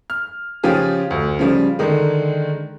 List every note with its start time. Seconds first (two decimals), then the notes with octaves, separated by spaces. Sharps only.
0.10 F6
0.63 C#3 F3 C#4 F4 G4 G#4
1.11 D2
1.39 C#3 F3 G3
1.79 D3 D#3 G#3